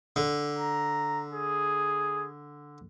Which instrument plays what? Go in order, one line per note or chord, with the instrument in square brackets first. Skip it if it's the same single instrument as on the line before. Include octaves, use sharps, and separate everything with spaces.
[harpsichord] D3
[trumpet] A#5
G#4